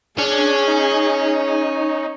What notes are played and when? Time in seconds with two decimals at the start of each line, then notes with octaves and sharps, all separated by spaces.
0.18 C#4 D4 G#4
0.67 D#4